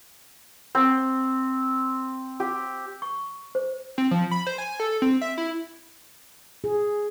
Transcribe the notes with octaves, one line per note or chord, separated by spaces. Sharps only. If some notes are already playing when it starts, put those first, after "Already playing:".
C4
G4
C#6
C5
C4
F3
B5
C5
G#5
A4
C4
E5
E4
G#4